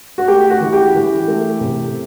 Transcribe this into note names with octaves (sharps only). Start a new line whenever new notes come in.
F#4
A3 G4
F#4
E3
G4
E3
A3
C3